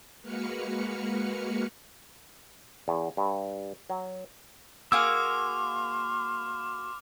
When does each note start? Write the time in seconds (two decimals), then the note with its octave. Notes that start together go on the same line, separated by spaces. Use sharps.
0.22 G#3 A#3 F#4 B4 F6 C#7
2.88 E2
3.17 G2
3.90 F#3
4.92 A#3 F#4 G#4 C6 D6 E6 F6